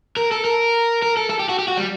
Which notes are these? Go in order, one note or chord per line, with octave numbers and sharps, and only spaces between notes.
A#4
A4
A#4
A#4
A4
A4
G4
F#4
G4
F#4
G3